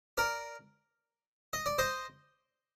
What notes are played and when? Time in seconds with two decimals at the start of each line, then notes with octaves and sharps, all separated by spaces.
0.18 A#4 D5
1.53 D#5
1.66 D5
1.78 C5 D#5